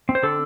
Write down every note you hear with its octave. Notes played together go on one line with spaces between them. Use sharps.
C4
C5
D3 A4